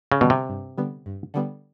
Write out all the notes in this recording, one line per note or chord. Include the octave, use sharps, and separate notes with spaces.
C#3
B2 D3 G3 B3
C3
G2
D3 G3 B3
G2
D3 G3 B3